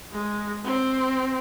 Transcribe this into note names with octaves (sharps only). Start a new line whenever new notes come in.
G#3
C4